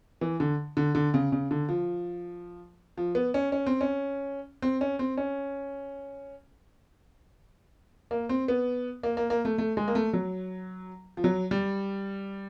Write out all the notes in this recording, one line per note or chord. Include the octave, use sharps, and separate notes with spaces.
E3
D3
D3
D3
C#3
C#3
D3
F3
F3
B3
C#4
C#4
C4
C#4
C4
C#4
C4
C#4
A#3
C4
B3
A#3
A#3
A#3
A3
A3
G#3
A#3
A3
F#3
F3
F#3
G3